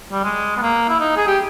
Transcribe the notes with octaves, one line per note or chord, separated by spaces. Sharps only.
G3
G#3
B3
A#3
E4
D#4
G#4
G4